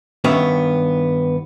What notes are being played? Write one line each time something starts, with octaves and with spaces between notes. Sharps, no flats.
G2 D#3 B3 C#4 E5